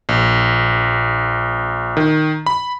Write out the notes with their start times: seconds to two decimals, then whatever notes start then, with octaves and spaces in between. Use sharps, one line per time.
0.09 A#1
1.97 D#3
2.46 B5